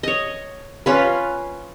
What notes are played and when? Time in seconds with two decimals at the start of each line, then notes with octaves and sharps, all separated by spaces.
0.03 C#5 D#5
0.86 C#4 F4 B4